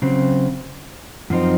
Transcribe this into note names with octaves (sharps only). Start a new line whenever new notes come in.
C#3 F#3 C4
F#2 F3 C4 D#4